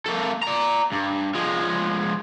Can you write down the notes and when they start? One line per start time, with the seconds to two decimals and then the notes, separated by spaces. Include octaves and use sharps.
0.06 A#3 A4
0.43 D5 A#5
0.92 G2
1.34 F3 G#3